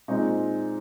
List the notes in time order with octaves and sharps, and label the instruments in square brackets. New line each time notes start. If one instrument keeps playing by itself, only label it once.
[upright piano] A#2 G#3 C4 D#4